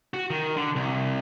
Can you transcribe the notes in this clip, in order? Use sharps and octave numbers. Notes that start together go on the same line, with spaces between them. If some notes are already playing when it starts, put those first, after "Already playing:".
F#4
D#3
D3
C2